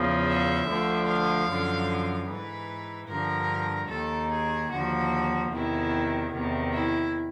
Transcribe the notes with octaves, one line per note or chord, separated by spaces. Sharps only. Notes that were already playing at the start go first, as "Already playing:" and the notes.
Already playing: E2 C#3 F3
E5
D2 D3 F3
F5
F#2 D3 F3
G#2 E3 B4
G2 D3 F3 A#4
D#2 D#3 A4
G#4
D#2 D3 F3 F#4
E2 C3 D#3 E4
E2 C3 D#3
E4